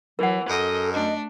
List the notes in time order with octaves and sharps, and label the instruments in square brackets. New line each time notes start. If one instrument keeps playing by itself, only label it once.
[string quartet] E3 [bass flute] F#3 [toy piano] A#4 F#5
[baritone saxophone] F#2 [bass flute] A4 [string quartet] D#5
[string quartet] A3 D4 [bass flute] D#5